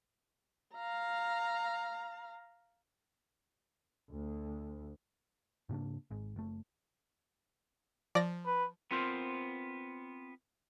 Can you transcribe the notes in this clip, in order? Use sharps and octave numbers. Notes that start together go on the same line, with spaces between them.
F5 A#5
D2
G#2 C#3 A#3 D4
G#1 G#2
F#1 A3
F3 D5 A#6
B4
B3 C4 F4 A#4 C5